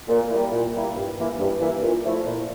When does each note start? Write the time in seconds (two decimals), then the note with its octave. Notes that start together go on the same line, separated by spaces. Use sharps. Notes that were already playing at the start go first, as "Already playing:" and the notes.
0.08 A#2
0.30 G3 A#3 E4
0.51 A#2
0.74 G3 A#3 E4
0.95 G2
1.17 E3 A#3 E4
1.38 G2
1.60 E3 A#3 E4
1.82 A#2
2.03 F3 A3 E4
2.25 A#2